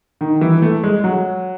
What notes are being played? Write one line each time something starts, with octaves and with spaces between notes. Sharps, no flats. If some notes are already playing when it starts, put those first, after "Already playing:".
D#3
E3
A3
G#3
F#3